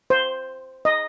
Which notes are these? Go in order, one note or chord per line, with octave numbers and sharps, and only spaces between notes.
C5
D#5